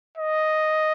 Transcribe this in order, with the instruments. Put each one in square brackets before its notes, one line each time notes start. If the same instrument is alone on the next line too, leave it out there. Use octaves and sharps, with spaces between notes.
[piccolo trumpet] D#5